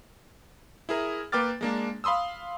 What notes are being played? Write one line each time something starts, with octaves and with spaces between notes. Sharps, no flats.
E4 G#4 A#4
A#3 B4 G5 D6 F6 A6
G#3 A#3 D4
F5 B5 C6 D#6 E6